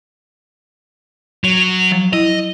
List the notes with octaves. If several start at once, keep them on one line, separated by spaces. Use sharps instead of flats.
F#3
F3 F#3
E4 D#5